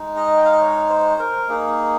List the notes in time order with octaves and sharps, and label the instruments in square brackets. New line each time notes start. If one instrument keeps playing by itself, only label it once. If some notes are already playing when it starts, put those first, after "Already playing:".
Already playing: [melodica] G#3 D#4
D#5
G5
F5
D#5
C#5
C5
A#4
A#3 D#4 G#4